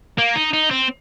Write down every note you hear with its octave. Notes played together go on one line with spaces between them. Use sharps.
A#3
D#4
D#4
C4